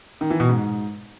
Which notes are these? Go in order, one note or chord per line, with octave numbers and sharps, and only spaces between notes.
D#3
E3
B2
G#2